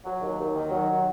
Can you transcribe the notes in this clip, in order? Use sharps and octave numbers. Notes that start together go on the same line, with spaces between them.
F#3
D#2
D#2
D#3
F#3